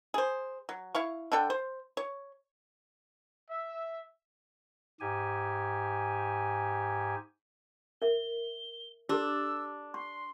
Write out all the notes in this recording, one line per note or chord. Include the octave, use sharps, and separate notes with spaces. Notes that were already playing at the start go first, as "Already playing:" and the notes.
G#4 C5
F#3
E4 F5 C#6
D3 D4 A4 G5
C5
C#5
E5
G#2 G4 G#5
A#4 E5 G7
D4 G4 A4 E6
C6 C#6